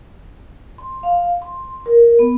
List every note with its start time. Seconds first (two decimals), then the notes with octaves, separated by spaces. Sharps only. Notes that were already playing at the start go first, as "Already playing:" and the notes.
0.78 C6
1.03 F5
1.42 C6
1.86 A#4
2.19 B3